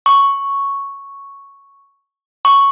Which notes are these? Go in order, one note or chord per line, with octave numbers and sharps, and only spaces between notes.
C#6
C#6